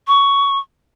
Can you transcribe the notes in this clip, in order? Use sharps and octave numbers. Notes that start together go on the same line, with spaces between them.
C#6